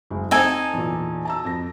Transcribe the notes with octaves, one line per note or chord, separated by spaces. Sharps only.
F#1 G#3
C4 D#4 A4 C5 G#5
E2 A#2
A5 A#5 E6
F2 A#6